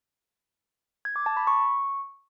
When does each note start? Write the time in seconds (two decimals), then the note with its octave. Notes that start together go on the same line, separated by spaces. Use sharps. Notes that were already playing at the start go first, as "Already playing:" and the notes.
1.05 G#6
1.16 D6
1.26 A5
1.37 B5
1.47 C#6